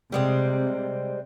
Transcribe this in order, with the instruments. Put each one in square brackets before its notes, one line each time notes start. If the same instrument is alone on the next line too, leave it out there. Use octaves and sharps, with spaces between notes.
[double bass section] C3 [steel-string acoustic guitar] G3 G#3 C4